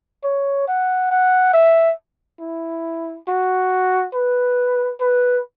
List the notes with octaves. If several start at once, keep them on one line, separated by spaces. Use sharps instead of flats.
C#5
F#5
F#5
E5
E4
F#4
B4
B4